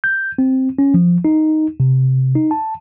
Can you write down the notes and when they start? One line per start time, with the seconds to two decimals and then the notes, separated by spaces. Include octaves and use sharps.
0.04 G6
0.38 C4
0.79 C#4
0.94 F3
1.25 D#4
1.80 C3
2.35 D#4
2.51 A5